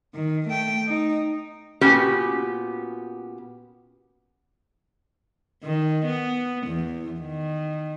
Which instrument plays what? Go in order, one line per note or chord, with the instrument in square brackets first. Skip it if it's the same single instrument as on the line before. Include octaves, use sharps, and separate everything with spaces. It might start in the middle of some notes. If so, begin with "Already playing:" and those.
[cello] D#3
A3 G5
D#4
[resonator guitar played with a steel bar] A#2 B3 C#4 F#4 G4
[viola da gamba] D#3
B3
E2
D#3